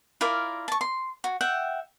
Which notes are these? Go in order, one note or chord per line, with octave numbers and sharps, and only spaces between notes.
E4 F4 A#4 D5
A5 C#6
C6
F#4
E5 F#5 G5